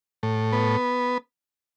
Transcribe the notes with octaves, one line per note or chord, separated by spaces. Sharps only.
A2
B3